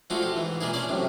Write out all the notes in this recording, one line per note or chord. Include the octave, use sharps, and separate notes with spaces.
F3 G#3 A3 D4 F4 F#4
G4
G#2 E3
A#2 G#3 A#3 D4 G#4
A#3 C#4 D4 D5
F#2 A2 C3